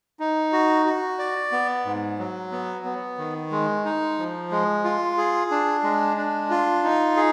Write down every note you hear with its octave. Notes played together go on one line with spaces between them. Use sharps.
D#4
F#4
F#4
D5
B3
G#2
F#3
B3
B3
D#3
G#3
D#4
F3
G#3
F4
G#4
D4
G#3
D4
F4
D#4
G#4